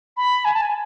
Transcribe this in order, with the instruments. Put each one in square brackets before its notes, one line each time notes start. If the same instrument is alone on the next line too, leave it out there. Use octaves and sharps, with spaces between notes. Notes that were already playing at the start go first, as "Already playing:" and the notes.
[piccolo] B5
G#5
A5
G#5